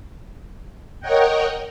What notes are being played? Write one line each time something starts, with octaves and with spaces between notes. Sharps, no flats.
A#4 C#5 D#5 F#5 G5